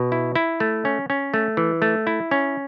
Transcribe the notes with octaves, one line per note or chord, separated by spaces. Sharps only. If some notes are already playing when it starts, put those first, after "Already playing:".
Already playing: B2
E4
E4
A3
C#4
C#4
A3
E3
A3
E4
C#4